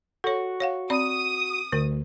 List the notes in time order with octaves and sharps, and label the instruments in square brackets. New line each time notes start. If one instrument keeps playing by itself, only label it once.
[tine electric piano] F#4 C#6 [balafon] A4 C#5
[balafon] C#5 F5 F#5
[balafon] C4 D5 B5 [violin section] D#6
[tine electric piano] D2 [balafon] D3 A#4